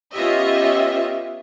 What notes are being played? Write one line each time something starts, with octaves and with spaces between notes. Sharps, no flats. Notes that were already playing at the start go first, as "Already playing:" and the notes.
B3 C#4 F4 G4 D#5 E5